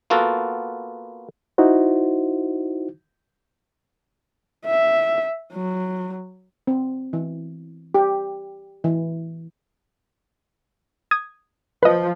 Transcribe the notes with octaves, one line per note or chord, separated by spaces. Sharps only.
A#3 B3 F4 F#4 A4
D#4 E4 F#4 C5
E5
F#3
C4
E3
G4
E3
D#6 G#6
F3 B4 D#5